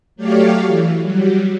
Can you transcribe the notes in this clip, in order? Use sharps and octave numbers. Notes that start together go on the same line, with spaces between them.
F#3 A3 G4 C#5 D5 F5
E3
F#3 G3